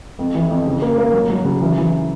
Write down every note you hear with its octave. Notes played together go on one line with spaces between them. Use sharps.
F2
E3
F2
C#3
A#3
A#3
F#3
F#3
C#3
E3
E3